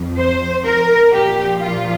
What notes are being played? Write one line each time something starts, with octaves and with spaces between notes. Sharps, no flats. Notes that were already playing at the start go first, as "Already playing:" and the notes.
Already playing: F2 F3
C5
A#4
A#2 F3 G4
F4